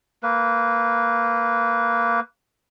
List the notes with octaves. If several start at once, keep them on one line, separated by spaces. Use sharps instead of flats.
A#3 B4